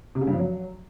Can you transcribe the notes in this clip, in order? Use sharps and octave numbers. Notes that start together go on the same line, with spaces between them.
C3
C#3
G2
F3
F#3